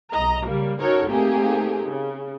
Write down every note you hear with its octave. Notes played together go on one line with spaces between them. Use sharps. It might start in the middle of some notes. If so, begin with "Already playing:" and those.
B1 D#5 A#5
C#3 G3 A#3
C#4 D#4 F#4 A4 A#4 C#5
A3 A#3 C4 D#4 G4 G#4
C#3